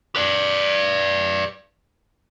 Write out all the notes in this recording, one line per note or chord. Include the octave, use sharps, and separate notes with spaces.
B4 D5